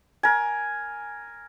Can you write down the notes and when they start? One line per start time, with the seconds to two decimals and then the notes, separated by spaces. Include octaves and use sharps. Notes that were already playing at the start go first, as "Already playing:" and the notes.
0.23 A#4 G#5